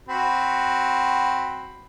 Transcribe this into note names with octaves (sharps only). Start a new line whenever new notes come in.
C4 F#4 B5